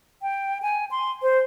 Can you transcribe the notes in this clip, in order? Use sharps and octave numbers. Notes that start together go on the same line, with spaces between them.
G5
G#5
C6
C5